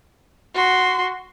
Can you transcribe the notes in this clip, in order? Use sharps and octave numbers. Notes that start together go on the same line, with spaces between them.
F#4 C6